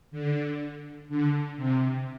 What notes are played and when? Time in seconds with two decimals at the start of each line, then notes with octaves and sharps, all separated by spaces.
0.11 D3
1.09 D3
1.57 C3